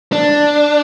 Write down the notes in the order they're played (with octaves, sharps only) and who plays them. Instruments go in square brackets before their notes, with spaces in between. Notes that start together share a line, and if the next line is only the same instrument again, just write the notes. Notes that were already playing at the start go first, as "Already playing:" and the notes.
[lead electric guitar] D4